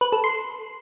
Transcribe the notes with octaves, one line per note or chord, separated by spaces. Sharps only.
B4
A4
C6